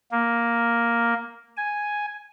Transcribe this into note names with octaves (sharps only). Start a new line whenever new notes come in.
A#3
G#5